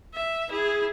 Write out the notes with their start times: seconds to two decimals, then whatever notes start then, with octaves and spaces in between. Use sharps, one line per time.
0.14 E5
0.49 E4 G#4